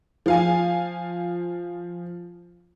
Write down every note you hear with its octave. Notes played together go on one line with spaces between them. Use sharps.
F3 F5 G#5